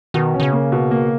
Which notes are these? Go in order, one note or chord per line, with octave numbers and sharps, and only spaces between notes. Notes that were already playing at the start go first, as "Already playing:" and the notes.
B2 D#3
C#4
D#3
C#3
A#3
B2
A#3